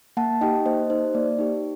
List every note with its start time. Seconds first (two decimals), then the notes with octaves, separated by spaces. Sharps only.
0.17 A#3 F#5 A5
0.41 D#4 G4 D#5 G5
0.66 A#3 C5 D#5
0.90 D#4 C5
0.93 G4
1.14 A#3 D5
1.39 D#4 G4